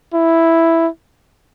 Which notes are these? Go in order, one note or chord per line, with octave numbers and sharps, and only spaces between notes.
E4